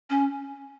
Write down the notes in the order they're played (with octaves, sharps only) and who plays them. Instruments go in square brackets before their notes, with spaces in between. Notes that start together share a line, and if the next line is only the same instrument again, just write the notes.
[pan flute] C#4